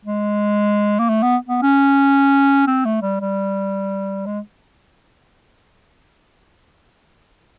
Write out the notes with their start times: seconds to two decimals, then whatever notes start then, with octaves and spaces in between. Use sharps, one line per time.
0.05 G#3
0.99 A#3
1.09 A3
1.22 B3
1.49 B3
1.62 C#4
2.68 C4
2.85 A3
3.02 G3
3.20 G3
4.26 G#3